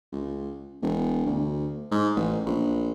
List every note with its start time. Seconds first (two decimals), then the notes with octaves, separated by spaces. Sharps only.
0.12 C#2
0.82 E1
1.26 D2
1.92 G#2
2.16 A1
2.46 A#1